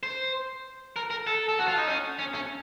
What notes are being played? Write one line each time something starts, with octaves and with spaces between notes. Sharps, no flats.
C5
A#4
A#4
A4
A4
F#4
F4
D#4
C#4
C#4
C#4